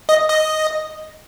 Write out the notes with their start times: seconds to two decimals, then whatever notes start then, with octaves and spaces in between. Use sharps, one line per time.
0.09 D#5
0.29 D#5